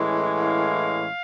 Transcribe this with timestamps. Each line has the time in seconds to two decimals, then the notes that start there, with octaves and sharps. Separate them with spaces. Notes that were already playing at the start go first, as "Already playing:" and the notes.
Already playing: A2 E3 G#3 C#4
0.36 F5